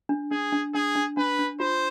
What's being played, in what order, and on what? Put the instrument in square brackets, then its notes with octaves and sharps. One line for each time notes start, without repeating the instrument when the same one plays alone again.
[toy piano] D4
[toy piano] D4 [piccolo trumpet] G#4
[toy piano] D4
[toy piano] D4 [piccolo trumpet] G#4
[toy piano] D4
[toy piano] D4 [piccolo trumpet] B4
[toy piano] D4
[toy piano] F4 [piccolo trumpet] C5